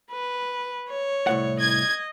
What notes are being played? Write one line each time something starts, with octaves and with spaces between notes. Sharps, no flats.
B4
C#5
C2 A2 F#5
D#5 G#6